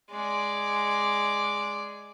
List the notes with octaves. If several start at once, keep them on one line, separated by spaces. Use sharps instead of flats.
G#3 D5